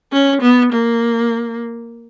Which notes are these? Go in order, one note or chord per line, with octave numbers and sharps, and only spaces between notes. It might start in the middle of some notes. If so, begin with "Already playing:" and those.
C#4
B3
A#3